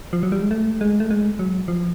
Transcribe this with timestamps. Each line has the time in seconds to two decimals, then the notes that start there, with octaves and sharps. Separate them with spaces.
0.13 F3
0.23 F#3
0.32 G3
0.42 G#3
0.51 A3
0.81 G#3
1.00 A3
1.11 G#3
1.39 F#3
1.68 F3